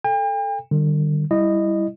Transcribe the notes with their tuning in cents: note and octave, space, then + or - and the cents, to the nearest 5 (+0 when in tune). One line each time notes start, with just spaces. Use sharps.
A4 +0 G5 +45
D3 +45 G3 +0
G3 +0 E4 +0 D#5 -15